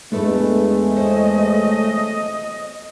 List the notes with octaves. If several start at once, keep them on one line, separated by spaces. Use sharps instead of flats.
E2 G#3 A3 B3 D4 A4 B4
C5 C#5 D#5